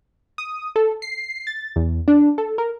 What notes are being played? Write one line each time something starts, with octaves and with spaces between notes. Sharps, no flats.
D#6
A4
C7
A6
E2
D4
A4
A#4